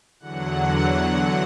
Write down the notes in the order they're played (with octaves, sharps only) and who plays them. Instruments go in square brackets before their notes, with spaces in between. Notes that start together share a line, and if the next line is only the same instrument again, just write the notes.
[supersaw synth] E2 D3 F#3 F#5